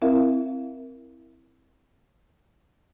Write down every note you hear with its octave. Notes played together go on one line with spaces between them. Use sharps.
C4 E4 A#4 E5 F5